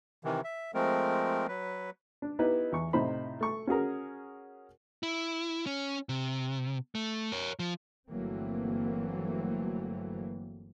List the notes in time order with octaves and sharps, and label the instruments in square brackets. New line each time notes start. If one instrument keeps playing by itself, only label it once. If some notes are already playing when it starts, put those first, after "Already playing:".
[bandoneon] C3 D#3 E3
E5
F3 G#3 A3 C4 A#4
F#3 B4
[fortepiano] D4
B3 D#4 E4 G4 B4 D#5
E2 C#6
A2 C3 D#4 C5 B5
A3 C#6
C#4 F#4 G#4 A#4
[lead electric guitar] E4
C#4
C3
A3
A#4 C#5
F3
[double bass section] G1 E3 F#3 A3 A#3 C4